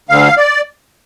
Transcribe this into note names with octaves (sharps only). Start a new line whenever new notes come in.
D2 D3 F5
D5